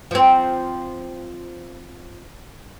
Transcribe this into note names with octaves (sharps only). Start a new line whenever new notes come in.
F3 C4